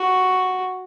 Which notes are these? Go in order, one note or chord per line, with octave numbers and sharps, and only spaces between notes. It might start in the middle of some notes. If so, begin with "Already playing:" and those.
Already playing: F#4